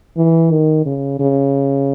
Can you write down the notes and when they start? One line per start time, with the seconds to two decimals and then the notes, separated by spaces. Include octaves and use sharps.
0.17 E3
0.51 D#3
0.86 C#3
1.20 C#3